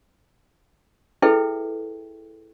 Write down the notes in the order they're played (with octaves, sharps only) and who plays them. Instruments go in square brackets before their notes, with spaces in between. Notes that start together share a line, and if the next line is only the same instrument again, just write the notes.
[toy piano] E4 G#4 A4 B4 E5 G5